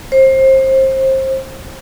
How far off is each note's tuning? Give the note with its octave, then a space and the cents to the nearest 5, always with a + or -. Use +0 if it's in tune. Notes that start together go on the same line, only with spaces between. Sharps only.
C5 +25